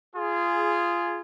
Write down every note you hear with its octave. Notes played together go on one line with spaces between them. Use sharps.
F4 G#4